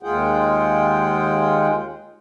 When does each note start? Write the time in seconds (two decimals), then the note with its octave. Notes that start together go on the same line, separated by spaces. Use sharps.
0.03 D#2 G#3 F4 G#4 F#5 G5